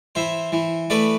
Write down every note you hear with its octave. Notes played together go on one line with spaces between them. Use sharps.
E3 C5 E5
E3
A3 B4 D5